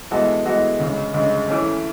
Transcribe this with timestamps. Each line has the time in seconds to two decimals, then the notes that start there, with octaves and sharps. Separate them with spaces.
0.11 E3 G#3 B3 F#4 A4
0.45 E3 G#3 B3 F#4 A4
0.80 D2 C#3 G#3
1.14 D2 C#3 G#3
1.48 E3 A3 C#4